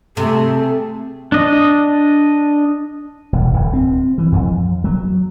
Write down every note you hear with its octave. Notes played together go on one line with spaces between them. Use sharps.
C3 A3 G#4 A4
D4 D#5
E1
D1
C4
E3
F2
F#3